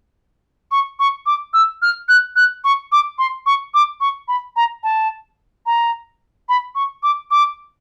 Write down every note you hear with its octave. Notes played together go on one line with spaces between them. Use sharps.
C#6
C#6
D6
E6
F6
F#6
F#6
C#6
D6
C6
C#6
D6
C#6
B5
A#5
A5
A#5
B5
C#6
D6
D6